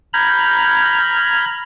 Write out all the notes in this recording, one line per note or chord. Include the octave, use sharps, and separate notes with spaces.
A#5 B5 F6 G6 G#6